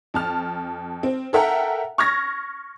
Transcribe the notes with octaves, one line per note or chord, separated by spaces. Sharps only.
F2 A5 F6
C4
A4 A#4 E5 F#5 G5 A#5
C#6 F6 G#6 A#6